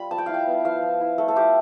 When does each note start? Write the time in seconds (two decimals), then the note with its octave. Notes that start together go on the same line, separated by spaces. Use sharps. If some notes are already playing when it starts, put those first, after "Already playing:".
Already playing: G3 F4 B5
0.11 F3 A5
0.18 G5
0.26 E4 F5
0.34 G5
0.46 B3
0.65 F3 F5
0.82 F3
1.01 E4
1.18 A3 A4
1.28 A4
1.35 F4 G4